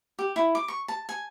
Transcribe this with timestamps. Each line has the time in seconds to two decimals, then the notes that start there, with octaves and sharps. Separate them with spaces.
0.19 G4
0.36 E4
0.55 D6
0.68 C#6
0.88 A5
1.09 G#5